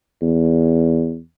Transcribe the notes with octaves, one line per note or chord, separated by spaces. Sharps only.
E2